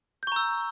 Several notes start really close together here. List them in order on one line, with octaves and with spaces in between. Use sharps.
G6 C#6 A#5 E6